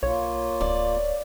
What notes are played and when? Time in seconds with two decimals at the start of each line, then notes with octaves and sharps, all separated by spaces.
0.03 B1 A#3 F4 C#5
0.61 D1 D5